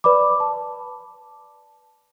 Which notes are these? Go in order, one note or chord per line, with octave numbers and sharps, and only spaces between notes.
B4 D5 B5 D6
A5